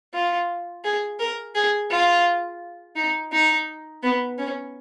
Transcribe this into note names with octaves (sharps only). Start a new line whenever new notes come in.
F4
G#4
A#4
G#4
F4
D#4
D#4
B3
C#4